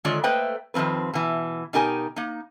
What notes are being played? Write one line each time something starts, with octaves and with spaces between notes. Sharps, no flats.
D3 D#3 G#3 F4 C#5 D5
A3 A#3 B4 C5 D#5 G5
F2 D#3 F3 C4 B4
B2 E3
B2 D#4 G4 A#4 G#5
A#3 D#4